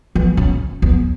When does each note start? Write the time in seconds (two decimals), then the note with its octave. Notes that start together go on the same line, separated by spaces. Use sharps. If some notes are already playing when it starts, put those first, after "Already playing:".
0.15 E3
0.37 C#3
0.82 E2